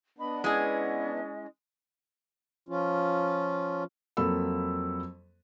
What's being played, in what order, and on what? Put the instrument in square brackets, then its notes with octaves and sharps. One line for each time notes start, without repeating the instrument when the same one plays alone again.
[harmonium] B3 D4 [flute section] D#5 B5
[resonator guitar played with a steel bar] G#3 G#4 [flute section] C#4 E4 D#5
[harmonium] F3 C#4 F4
[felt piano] F2 F#3 A#3 A4 B5 E6